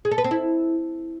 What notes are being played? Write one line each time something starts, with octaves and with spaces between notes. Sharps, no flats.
G#4
A4
B4
C4
E4